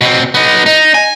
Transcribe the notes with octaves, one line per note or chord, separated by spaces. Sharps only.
B2 C4
B3 D#4
D#4
G#5